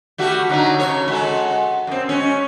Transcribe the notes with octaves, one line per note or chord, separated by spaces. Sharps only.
G3 A3 F#4
D3 F#3 D#4
C#3 C#5
G#3 F#4 A4
F#2 C4
G#3 C#4